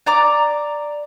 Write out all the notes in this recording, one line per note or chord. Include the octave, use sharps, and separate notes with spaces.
D5 A#5 D6